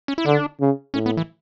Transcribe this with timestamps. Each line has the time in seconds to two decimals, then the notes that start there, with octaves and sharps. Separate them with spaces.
0.08 C#4
0.18 E4
0.26 D3 D4
0.61 C#3
0.94 A2 C#4
1.06 B3
1.17 E3